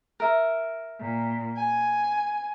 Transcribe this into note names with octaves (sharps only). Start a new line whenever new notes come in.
A#4 E5
A#2
G#5